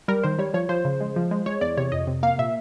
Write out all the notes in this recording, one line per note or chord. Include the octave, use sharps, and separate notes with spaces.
G3 A#4
D#3 C5
G3 C#5
F3 C#5
F3 C5
C#3
G#3
F3
G#3
G#3 C#5
E2 D5
C3 C#5
F2 D#5
C3
A#3 F5
A#2 E5